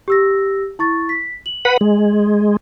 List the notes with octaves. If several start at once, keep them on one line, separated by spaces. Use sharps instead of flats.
G4 E6 A#6
E4 C#6 A6
B6
F#7
B4 F#5 B5
G#3